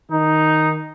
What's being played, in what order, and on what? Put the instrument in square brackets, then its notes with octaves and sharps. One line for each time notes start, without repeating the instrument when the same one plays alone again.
[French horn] D#3 [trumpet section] D#4